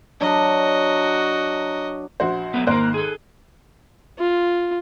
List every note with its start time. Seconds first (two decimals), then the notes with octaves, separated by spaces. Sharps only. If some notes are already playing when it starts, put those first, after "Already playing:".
0.20 F#3 D4 F#4 D#5
2.20 A#1 F#4 C5
2.54 F#3 A3 B3
2.67 G#1 A#3 A#4 C5 F#6
2.94 G#4 A4
4.19 F4